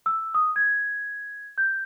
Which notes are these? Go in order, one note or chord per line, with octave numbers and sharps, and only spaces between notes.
E6
D#6
G#6
G6